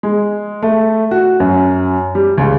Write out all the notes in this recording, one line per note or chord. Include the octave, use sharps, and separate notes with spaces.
G#3
A3
F#4
F#2
G3
C#2